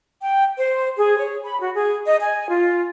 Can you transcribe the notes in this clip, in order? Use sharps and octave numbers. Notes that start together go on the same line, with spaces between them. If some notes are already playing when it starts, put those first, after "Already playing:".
G5
C5
G#4
C#5
B5
F#4
G#4
D#5
G#5
F4